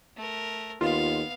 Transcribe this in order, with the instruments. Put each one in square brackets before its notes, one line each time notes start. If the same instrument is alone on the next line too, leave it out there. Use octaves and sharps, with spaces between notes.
[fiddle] A3 A#4
[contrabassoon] D#2 [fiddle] B3 F5 [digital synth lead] F4